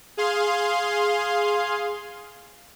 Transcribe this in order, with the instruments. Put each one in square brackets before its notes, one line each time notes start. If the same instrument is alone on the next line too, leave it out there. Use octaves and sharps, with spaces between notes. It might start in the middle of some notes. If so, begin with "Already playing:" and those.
[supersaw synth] G#4 F5 C6